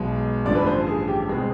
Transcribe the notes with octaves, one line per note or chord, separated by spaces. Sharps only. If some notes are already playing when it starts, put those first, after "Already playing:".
Already playing: B1 B2 G#3
A1 G2 D3 F3 D5
B4
C5
G#4
G4
C#2 B2 G#3 C4